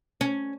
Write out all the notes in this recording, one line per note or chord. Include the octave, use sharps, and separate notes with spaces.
C#4